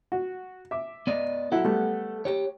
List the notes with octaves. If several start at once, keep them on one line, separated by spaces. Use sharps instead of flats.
F#4
E5 D6
B3 D5 D#5
F#3 E4 A4 F#5
G3 A3 B3
G4 C#5